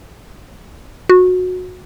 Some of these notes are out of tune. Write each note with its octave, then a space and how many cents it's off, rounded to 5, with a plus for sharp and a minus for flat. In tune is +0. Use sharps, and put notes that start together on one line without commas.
F#4 -20